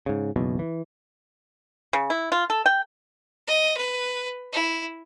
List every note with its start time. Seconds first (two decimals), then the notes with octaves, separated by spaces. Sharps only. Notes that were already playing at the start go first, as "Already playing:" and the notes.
0.06 G#2 C#3
0.36 F#1 B1 E2 B2
0.59 E3
1.93 C#3
2.10 E4
2.32 F4
2.50 A4
2.66 G5
3.47 D#5
3.77 B4
4.53 E4